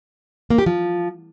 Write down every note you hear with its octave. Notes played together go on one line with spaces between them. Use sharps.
A#3
G4
F3